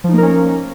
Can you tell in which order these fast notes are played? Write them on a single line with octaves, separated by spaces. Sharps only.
F3 D#4 A#3 A#4 C#4